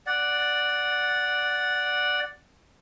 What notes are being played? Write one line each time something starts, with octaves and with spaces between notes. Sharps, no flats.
D5 F#5